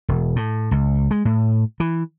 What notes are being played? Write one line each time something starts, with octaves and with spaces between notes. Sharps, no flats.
E1
A2
C#2
G#3
A2
E3